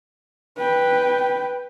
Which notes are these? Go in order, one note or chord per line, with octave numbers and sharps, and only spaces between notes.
B4 G5